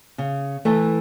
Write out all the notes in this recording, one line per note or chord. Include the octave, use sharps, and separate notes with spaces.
C#3
E3 A3